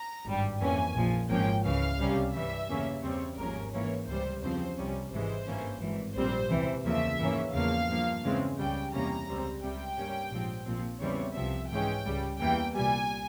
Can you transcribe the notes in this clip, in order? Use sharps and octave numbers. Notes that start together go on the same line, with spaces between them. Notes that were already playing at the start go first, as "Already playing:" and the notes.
Already playing: A#5
G#1 G2 G3
F2 E3 A#3 C#4 G#5
A#1 A#2 F3
G#1 G#2 F3 A#3 C#4 G5
C#2 C#3 E3 F5
C2 C3 G3 C#4
G2 E3 G3 E5
E2 C#3 E3 A#3 C#4
E2 C#3 G3 C4 C#5
G#1 G#2 F3 A#3 C#4 A#4
G#2 E3 A#3 C#4 C#5
C#2 C3 E3 G3 C5
E2 C#3 F3 C4 C5
C2 C3 G3 C#4
G#1 G#2 E3 G#3 C5
G#1 G2 E3 A#3 C#4
G#1 G#2 E3
A#1 A#2 G3 C4 C5
C#2 C3 E3
E2 C#3 F3 A#3 E5
G#2 E3 A#3 C#4
E2 C#3 F3 A#3 F5
G2 F3 A#3
E2 C#3 E3 G#3 C4
C#2 C#3 G3 G5
E2 C3 G3 A#3 C#4 A#5
C#2 C#3 G3 C4
C#2 C3 G3 G5
G2 G3 A#3 C#4
A#1 G#2 F3 C4
A#1 A#2 F3 C4
E2 C#3 E3 G3 C4 C#5
C2 C3 F3 E5
G#2 E3 G#3 C#4 G5
C#2 C#3 G3
E2 E3 A#3 G5
C2 A#2 G3 G#5